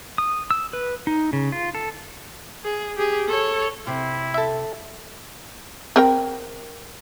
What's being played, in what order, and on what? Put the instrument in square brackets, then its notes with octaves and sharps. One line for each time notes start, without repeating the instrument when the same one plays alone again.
[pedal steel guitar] D#6
E6
B4
D#4
C#3
F4
A4
[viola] G#4
G4 G#4
A4 C#5
[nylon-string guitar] C3 [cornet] E4
[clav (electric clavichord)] A4 E5
[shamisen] C4 A#4 G5